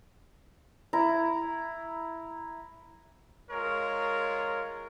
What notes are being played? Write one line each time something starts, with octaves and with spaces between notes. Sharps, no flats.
E4 A#5
G#3 F4 A#4 C#5